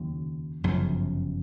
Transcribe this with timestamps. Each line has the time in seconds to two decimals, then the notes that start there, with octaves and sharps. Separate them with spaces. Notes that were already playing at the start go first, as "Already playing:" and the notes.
Already playing: F1 D#2 C#3 F#3
0.63 G1 F#2 C#3 F3